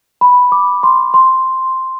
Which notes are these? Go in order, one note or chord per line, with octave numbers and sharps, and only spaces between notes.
B5
D6
C6
C6